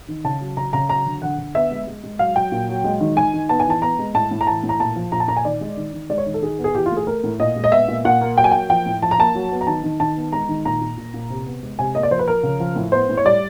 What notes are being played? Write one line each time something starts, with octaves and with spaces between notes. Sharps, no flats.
D#3
C#3 A5
F#3
C#3 A#5
C#3 A#5
F#3 A#5
D3
D3 F#5
D3
B3 E5
G#3
G#3
G#3
F#3 F5
F#3 G5
A#2
F#3
G#3
D#3
D#3 G#5
D#3
B3 A5
G#5
E3 A5
B3 A#5
G#3
A2 A5
A2
A#5
E3 A5
A2
A#5
A#2 A5
F3
A#2 A#5
A5
A#2 A#5
G#5
D#3 D5
G#3
D#3
D#3
G#3 D5
C#5
D#3
A4
D#3 G#4
B3
G#4
E3 G4
F4
A3
G#4
A3 A#4
A2
A#2 D#5
G#3
D#5
B3 E5
A#2
A#2 F#5
A#3
F#3 G5
G#5
A#3 G5
F3 G5
A2
F3 A5
A#5
A#3 A5
F#3
B3
A#5
D#3 A5
D#3
D#3 A5
B3
G#3 A#5
D#3
A#2 A#5
A#2
A#2
A#2
C3
B3
G#3
C3 G#5
A#3 D#5
D5
F3 C5
B4
F3 A#4
C#3
F3
A2
B3 C5
A2
C#5
G3 D5